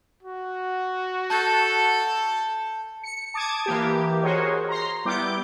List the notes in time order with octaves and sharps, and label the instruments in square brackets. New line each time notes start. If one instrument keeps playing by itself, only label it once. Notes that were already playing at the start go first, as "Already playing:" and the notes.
[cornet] F#4
[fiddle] A4 [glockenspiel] A5 G6
[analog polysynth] C#7
A5 D6 D#6 G#6
E3 A#3 G4
F#4 G#4 A#4 C5 C#5 D#5
A#5 C6
G3 B3 E4 D6 G6